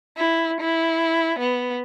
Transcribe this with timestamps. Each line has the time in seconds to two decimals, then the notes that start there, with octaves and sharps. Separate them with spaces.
0.17 E4
0.61 E4
1.39 B3